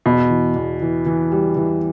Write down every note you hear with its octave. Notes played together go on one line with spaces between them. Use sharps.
E2 B2
E3
E2
E3
E3
G3
E3